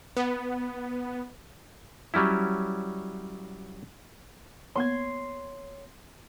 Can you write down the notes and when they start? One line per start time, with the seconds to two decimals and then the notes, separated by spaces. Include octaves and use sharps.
0.17 B3
2.14 F#3 G3 C#4 E4
4.76 A#3 B3 C#5 C6 G#6